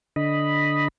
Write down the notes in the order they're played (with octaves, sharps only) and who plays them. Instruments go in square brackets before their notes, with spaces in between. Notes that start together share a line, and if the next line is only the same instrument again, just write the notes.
[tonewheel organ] D3 D#5 B5